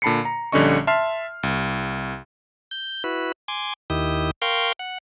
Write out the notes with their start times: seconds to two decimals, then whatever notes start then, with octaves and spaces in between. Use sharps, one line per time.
0.02 A#2 D3 A5 B5 C7 C#7
0.25 A#5
0.52 A#1 D3 G3 C#4 D#5 C#6
0.87 E5 A5 C6 F6 C7
1.43 C2
2.71 G6
3.04 E4 F#4 B4
3.48 G#5 C6 D6
3.90 D#2 D#3 E4 G4 D#6
4.42 A#4 F5 G5 C6 C#6
4.79 F#5